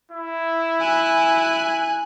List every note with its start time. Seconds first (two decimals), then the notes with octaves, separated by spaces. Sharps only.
0.12 E4
0.80 G#5 F#6